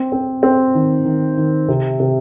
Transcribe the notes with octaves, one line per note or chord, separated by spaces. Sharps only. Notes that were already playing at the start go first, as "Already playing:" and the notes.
Already playing: C4
C4
C4
D#3
D#3
D#3
C3
C3